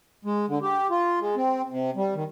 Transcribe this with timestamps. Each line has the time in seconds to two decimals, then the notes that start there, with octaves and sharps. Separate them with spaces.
0.25 G#3
0.48 D3
0.62 G4
0.91 F4
1.20 G#3
1.36 C4
1.70 C3
1.96 G3
2.15 D#3